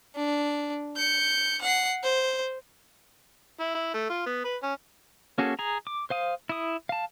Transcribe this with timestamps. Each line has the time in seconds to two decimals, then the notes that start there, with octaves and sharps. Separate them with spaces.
0.16 D4
0.97 G6 C#7
1.62 F#5 C7
2.04 C5
3.60 E4
3.75 E4
3.94 A3
4.10 F4
4.26 B3
4.44 B4
4.63 C#4
5.38 A#3 C#4 F#4 G#4 A4
5.59 G#4 A#5
5.87 D6
6.10 C5 F5 D#6
6.49 E4 D#6
6.89 F5 A5